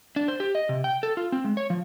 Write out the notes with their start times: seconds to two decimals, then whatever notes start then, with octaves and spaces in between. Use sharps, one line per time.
0.16 D4
0.28 C5
0.40 G4
0.55 D#5
0.69 C3
0.84 G5
1.03 A4
1.17 F4
1.32 C4
1.44 G#3
1.57 C#5
1.70 F3